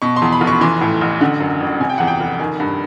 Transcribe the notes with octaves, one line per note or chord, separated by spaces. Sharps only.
B2 C#6
C6
E2
B5
F1
C#6
E3 C6
A2
A1
D3 F#5
F#2
G1
C3 G#5
G5
E2 F#5
G5
F1
D#3 G#5
G2